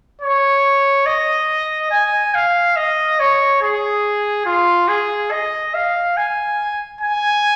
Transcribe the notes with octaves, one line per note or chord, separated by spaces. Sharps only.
C#5
D#5
G#5
F5
D#5
C#5
G#4
F4
G#4
D#5
F5
G#5
G#5